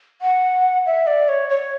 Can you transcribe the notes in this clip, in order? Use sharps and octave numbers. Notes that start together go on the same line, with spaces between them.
F#5
E5
D5
C#5
C#5